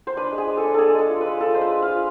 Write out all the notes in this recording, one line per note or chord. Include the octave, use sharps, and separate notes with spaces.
C5
D4 B4
G#3
G#4
G#3
A4
D4
D4 G#4 A4
G#3 A4
F4
B4
G#3
F4 A4
G#3 C5
B4
G#3
F5
F4